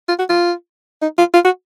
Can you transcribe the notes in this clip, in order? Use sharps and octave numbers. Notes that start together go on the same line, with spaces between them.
F4
F#4
F4
D#4
F4
F4
F#4